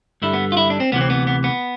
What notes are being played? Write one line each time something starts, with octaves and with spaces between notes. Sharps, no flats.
G2 D3 G3 E4
B3
F4
E4
D4
C4
D2 C3 E3 B3
C4
B3
B3
B3